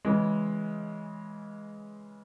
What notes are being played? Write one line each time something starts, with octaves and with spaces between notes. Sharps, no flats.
C#3 E3 G#3